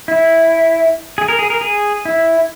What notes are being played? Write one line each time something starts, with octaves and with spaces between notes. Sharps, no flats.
E4
G#4
A#4
G#4
A#4
G#4
E4